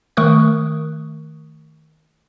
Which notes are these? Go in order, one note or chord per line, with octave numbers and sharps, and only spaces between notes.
D#3 A3 A#4 C#6 D#6 F#6